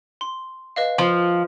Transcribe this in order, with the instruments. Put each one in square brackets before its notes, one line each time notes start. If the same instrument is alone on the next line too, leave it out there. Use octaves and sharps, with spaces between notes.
[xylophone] C6
B4 D#5 F5
[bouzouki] F3